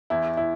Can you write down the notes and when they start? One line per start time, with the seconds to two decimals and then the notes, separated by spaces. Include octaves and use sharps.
0.10 E2 E4
0.37 E4